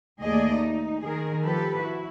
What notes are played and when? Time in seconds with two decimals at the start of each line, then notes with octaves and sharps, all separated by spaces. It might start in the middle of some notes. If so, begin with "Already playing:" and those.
0.22 D#2 A3 G#4 D5 D#5
0.55 D#4
1.04 D#3 G#4 A#4
1.43 F3 G4 A4 B4
1.80 E4 F#4